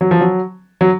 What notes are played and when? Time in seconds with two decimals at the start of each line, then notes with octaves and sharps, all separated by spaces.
0.01 F#3
0.11 F3
0.21 F#3
0.81 F#3